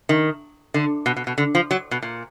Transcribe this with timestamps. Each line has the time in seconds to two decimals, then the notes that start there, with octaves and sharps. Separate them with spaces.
0.09 D#3
0.74 D3
1.06 B2
1.16 B2
1.27 B2
1.38 D3
1.55 F3
1.71 F#3
1.91 B2
2.02 A#2